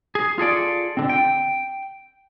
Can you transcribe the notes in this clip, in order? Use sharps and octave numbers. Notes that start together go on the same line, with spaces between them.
G#4
F4 G#4 A4 D5
D3 C4
G5